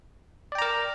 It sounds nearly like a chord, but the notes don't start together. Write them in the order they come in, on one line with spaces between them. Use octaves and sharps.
D5 G5 A#5 A#4